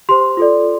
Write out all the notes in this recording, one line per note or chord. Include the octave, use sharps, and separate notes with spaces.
G4 C5 C6
F4 A4 D5